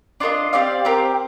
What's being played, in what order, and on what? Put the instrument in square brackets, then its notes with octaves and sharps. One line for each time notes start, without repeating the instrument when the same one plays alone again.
[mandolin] D4 F4 A4 D#5
C4 G4 D5 F5
C4 G4 A#4